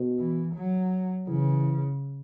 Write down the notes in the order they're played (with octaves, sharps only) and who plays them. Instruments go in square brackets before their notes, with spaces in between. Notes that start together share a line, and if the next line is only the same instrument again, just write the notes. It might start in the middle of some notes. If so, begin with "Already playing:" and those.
Already playing: [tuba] B2
[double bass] E3
F#3
[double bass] C#3 [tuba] E3